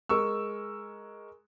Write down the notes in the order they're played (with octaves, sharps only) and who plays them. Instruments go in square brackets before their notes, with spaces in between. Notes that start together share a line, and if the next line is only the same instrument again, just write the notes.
[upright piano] G#3 A#4 C#6 E6